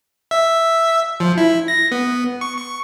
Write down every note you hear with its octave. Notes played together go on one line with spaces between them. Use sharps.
E5
F3
E4
A#6
B3
C#6
C#6